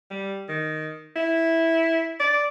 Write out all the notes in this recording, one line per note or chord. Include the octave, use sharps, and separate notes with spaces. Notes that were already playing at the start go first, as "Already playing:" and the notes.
G3
D#3
E4
D5